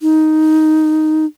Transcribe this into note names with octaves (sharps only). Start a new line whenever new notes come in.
D#4